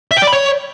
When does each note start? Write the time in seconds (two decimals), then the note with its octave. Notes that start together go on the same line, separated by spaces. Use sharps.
0.11 E5
0.17 G5
0.22 D5
0.27 B5
0.33 C#5